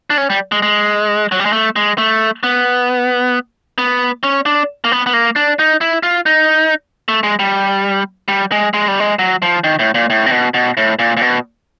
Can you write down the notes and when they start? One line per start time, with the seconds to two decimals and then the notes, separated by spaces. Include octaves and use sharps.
0.10 D4
0.18 C#4
0.30 G3
0.52 G#3
0.62 G#3
1.32 F#3
1.40 G3
1.45 G#3
1.53 A3
1.76 G#3
1.98 A3
2.43 B3
3.78 B3
4.23 C#4
4.46 D4
4.84 A#3
4.92 B3
5.06 B3
5.13 A#3
5.36 D4
5.59 D#4
5.81 E4
6.03 F4
6.26 D#4
7.08 A3
7.23 G#3
7.39 G3
8.28 G3
8.52 G#3
8.74 G#3
8.88 G3
9.00 G#3
9.19 F#3
9.42 F3
9.64 D#3
9.79 A2
9.94 A#2
10.10 A2
10.26 C3
10.32 B2
10.54 B2
10.77 A2
10.99 A#2
11.17 A#2
11.21 B2